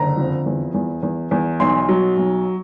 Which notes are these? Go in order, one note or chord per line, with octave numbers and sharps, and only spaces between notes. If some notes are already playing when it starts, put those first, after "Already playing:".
Already playing: F#1 D3 A#5
F2
E2
E2
E2
E2
B1 C6
F#3
B1